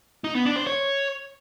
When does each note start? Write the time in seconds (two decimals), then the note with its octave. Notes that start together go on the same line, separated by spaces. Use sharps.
0.24 D#4
0.35 B3
0.45 D4
0.56 C5
0.67 C#5